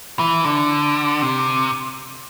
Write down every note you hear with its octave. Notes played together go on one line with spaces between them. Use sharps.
E3
D3
C3